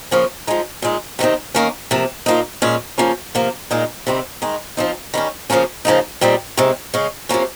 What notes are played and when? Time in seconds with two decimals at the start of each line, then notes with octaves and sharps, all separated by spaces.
0.11 C#3 F3 A#3 C#4
0.47 F3 G#3 D#4
0.82 A#2 G#3 D#4
1.19 C3 D#3 G3 C4 D#4
1.55 D#3 A#3 C#4
1.91 C3 F3 A#3
2.26 A#2 F3 A#3 D#4
2.62 A#2 G#3 C#4
2.98 C#3 F3 A#3 C#4
3.35 C3 F3 A#3
3.71 A#2 G#3 D#4
4.07 C3 D#3 G3 C4
4.42 D#3 G#3 D#4
4.77 F3 C4 D#4
5.14 D#3 G3 C#4
5.50 C#3 F3 A#3 C#4
5.85 C#3 F3 A#3 D#4
6.21 A#2 G3 C4 D#4
6.57 C3 D#3 G#3
6.94 C#3 G#3 C#4
7.29 C3 F3 A#3 C#4